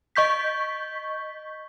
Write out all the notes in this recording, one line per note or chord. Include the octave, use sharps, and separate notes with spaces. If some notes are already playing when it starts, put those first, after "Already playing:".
D#5 C#6 G6 B6